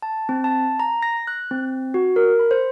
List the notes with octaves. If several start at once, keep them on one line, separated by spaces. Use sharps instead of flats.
A5
C4
A5
A#5
A#6
F#6
C4
F#4
A#4
B5
C5